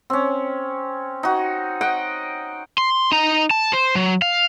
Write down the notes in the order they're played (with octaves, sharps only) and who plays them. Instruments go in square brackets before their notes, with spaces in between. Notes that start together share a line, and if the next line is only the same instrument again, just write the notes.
[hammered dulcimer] C4 C#4
D#4 F#4
D#5 F#5 G5
[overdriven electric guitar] C6
D#4 A#5
A5
C5
F#3
F5